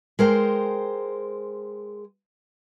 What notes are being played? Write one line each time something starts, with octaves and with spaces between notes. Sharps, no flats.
G#3 A#4 C5 G5